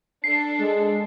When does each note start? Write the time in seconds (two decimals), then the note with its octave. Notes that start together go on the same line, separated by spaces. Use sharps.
0.24 D4 A4 C7
0.59 G#3